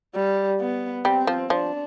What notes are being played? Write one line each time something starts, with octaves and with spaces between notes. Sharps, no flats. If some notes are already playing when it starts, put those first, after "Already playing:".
G3
B3
G3 C4
F3
F3 D4